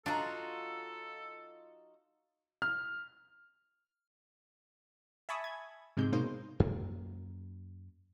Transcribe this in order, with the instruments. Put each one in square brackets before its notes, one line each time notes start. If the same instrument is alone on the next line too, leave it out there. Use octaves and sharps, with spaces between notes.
[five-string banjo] F#3 A#5 [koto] D4 [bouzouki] D#4 F4 F#4 [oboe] A4
[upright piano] F6
[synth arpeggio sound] E5 G#5 A5 B5 C#6 D#6
G#6
G#2 C3 G#3 G6
B2 G#3 A#3 D#4 C5
[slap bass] F#2 A#3